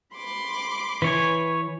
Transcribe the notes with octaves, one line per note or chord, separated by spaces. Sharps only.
B5 C6 D6
E3 B4 C#5 G#5